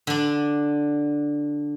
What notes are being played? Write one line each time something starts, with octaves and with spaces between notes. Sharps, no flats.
D3 D4